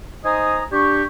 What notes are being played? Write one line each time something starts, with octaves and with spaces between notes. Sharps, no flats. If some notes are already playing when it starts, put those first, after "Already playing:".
D#4 C5 D#5 G#5 A#5 D#6
D4 G4 C#6